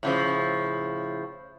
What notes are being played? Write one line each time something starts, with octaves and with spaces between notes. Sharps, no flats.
A2 C#3 F3